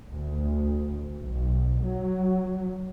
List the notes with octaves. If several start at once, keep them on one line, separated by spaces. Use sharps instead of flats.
D2
B1
F#3